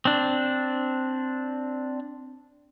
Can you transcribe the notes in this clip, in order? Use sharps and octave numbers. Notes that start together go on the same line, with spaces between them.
C4 D4